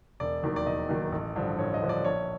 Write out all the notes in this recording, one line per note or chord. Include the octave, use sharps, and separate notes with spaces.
E1 D5
D#2 D#3 F#3
D5
E1 D#5
D#2 D#3 F#3
A1
G2 D3 F3
A1 C#5
D#5
G2 D3 F3
D5
A#1 C#5